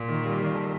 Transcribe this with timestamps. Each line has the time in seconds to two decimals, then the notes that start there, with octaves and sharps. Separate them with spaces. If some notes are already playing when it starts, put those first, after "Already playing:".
Already playing: A#2
0.08 D#3
0.25 G3
0.40 D#3
0.55 A4